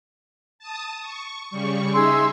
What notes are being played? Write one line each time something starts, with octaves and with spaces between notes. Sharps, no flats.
A5 D#6
C#6
C#3 G3 C#6
D#4 G#4 E5 C6 E6